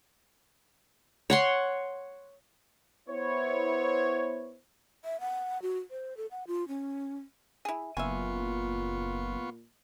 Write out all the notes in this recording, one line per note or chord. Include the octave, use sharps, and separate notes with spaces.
C#5 F#5 C6
B3 E4 C5 C#5
E5
F#5
F#4
C5
A4
F#5
F4
C#4
E4 G#4
F#1 A#2 B3 F4 E5 G#5 C#6